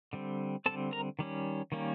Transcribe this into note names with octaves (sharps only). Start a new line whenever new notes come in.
D3 G3 C4
D3 G3 C4 A4 A5
A#4 A#5
D#3 G3 C#4
D#3 G3 A#3 C#4